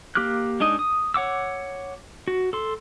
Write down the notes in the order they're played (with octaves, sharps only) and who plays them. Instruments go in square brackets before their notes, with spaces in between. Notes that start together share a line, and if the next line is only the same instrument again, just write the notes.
[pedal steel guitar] A#3 G4 D6 F6 F#6
G#3 D4 D#4 D#5
D#6
C#5 F#5 D6 E6
F#4
A4 C6